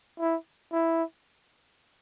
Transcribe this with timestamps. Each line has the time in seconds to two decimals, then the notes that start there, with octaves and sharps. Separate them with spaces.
0.20 E4
0.72 E4